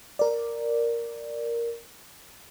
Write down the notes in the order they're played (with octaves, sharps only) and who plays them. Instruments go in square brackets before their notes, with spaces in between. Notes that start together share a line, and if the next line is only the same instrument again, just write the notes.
[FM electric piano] A#4 D5